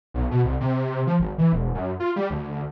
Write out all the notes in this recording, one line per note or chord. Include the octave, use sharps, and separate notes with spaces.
B1
B2
C2
C3
F3
G#1
E3
E1
F#2
F4
G3
D2